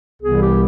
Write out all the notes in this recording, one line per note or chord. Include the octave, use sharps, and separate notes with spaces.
C2 C3 E3 G3 B3 G#4
G4